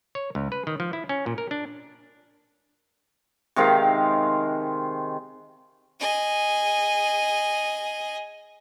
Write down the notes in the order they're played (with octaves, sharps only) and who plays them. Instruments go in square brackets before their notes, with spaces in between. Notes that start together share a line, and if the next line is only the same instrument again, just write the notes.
[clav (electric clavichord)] C#5
C#2
B4
D#3
F3
E4
C#4
A#2
A#4
D4
[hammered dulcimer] C3 D#3 G#3 F5
[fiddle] G#4 D#5